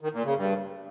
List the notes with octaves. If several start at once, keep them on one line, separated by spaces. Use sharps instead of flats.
D#3
A#2
C#3
G2